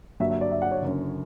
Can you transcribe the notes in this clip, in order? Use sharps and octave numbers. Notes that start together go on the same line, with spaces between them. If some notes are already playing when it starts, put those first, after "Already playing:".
G2 D3 F#3 A#3 E5
E5
D5
E5
F#5
C#5
F#1 F#2 D3